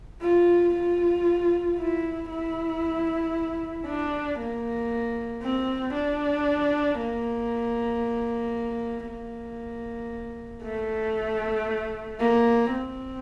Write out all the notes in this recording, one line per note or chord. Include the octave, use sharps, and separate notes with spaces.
F4
F4
E4
E4
D4
A#3
C4
D4
A#3
A#3
A3
A#3
C4